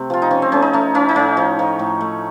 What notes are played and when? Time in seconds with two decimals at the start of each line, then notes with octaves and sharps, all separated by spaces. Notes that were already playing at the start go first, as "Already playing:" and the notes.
Already playing: C3 A3 C4
0.10 F3 F4
0.22 D#4
0.31 F3 C#4
0.42 C4
0.52 A3 C#4
0.62 D#4
0.73 A3 C#4
0.94 F3 C#4
1.09 D#4
1.16 A2 C#4
1.37 F3
1.59 F3
1.79 A2
2.01 A3